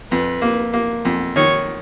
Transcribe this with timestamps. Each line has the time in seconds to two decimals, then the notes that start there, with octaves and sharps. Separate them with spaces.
0.11 F2 B4
0.42 A#3
0.73 A#3
1.05 F2
1.36 D#3 C#5